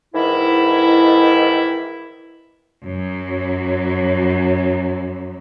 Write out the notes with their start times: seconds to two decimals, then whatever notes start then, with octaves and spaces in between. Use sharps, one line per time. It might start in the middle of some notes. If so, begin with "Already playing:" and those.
0.14 G#2 D#3 E3 E4
2.84 F#2 F#3